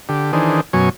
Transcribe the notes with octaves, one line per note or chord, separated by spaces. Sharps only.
D3 G4
D#3 E3 D4 G#4 C5
F#2 B2 F#3 C#4 G#5 C#6